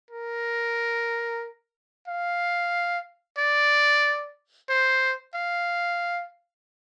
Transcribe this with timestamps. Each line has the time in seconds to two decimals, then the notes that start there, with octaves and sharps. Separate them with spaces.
0.11 A#4
2.08 F5
3.38 D5
4.70 C5
5.35 F5